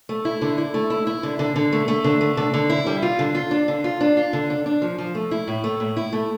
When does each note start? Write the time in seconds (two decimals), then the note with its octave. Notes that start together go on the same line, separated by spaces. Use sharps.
0.09 A3
0.25 E4
0.41 D3
0.58 E4
0.74 A3
0.90 E4
1.07 E4
1.23 D3
1.39 D3
1.56 D3
1.72 A3
1.88 A3
2.04 D3
2.21 A3
2.37 D3
2.54 D3
2.70 E4
2.87 G3
3.02 F4
3.19 D3
3.35 F4
3.51 D4
3.68 D3
3.84 F4
4.01 D4
4.17 F4
4.33 D3
4.50 D4
4.66 D4
4.82 F3
4.98 F3
5.15 A3
5.31 E4
5.48 A2
5.64 A3
5.80 A2
5.96 E4
6.13 A3